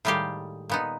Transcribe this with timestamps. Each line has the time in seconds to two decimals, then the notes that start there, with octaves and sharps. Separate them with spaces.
0.05 A2 D#3 G3 G#3 G4 F5
0.69 A#2 B3 D#4